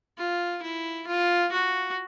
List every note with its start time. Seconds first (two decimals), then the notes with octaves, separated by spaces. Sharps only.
0.18 F4
0.62 E4
1.07 F4
1.52 F#4